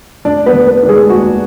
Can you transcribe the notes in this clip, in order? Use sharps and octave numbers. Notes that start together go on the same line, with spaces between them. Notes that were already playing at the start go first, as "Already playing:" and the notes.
F1 D4 D5
B3 B4
F1
B3 B4
D#3
G#3 G#4
D#2 F#4